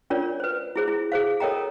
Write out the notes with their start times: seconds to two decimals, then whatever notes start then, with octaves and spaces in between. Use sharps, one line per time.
0.10 C#4 D4 F4 A#4 C#5 D5
0.40 B4 C5
0.76 E4 G#4 C5
0.88 E4
1.12 G#4 C5 F5
1.40 A4 A#4 C#5 D#5 G5 A#5